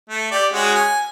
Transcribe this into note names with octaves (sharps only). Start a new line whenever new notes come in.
A3
G4 D5
G#3 C#4 F#4
G#5